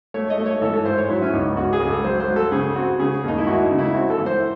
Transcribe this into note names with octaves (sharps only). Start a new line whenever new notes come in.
A3 C#5
D#5
A3
C#5
E3 A4
A4
G#2 C5
C#5
F#3 E4
C#4
C#2 D#4
C#2 F#4
G#4
C#2
A4
F#3 C5
C5
F#3
A4
C#3 G#4
C4 F#4
C#3 G#4
D#2 D#4
E4
D#2 F#4
D#4
C#3
E4
C4 F#4
A4
E3
C5